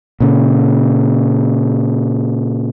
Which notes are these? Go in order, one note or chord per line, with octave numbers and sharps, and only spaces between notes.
A#2 C#3